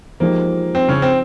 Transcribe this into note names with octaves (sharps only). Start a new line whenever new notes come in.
F3 G#3 A#3 D#4 G4
C4
C#3 C#4
C4